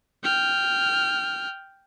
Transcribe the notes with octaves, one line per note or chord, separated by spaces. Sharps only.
G5 F6